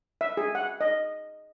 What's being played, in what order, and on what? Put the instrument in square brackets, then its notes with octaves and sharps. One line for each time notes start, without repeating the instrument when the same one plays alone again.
[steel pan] E5
G#4
F#5
D#5